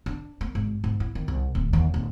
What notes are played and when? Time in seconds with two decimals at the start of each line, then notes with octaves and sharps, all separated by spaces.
0.06 D4
0.41 A#3
0.55 G#1
0.84 G#2
1.00 E4
1.15 D#3
1.28 C2
1.55 D1
1.73 D#2
1.94 D1